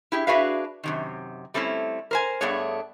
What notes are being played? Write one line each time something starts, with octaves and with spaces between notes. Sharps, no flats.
E4 G4 G#4
D4 F#4 G#4 B4 E5 F5
F#2 C3 D#3
G3 A3 C4 C#4 E4
A#4 C5 G#5
G2 A3 B3 D4 G#4 C#5